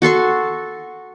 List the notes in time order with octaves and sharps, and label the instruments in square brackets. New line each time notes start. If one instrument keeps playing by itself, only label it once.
[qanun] F#4 A4 C6 C#6